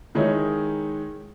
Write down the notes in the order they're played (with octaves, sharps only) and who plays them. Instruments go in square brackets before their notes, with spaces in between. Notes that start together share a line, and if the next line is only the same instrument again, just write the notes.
[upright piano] D#3 G#3 D#4 E4 C#5